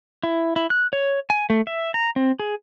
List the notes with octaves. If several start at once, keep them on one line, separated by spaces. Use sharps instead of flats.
E4
E4
F#6
C#5
G#5
A3
E5
A#5
C4
G#4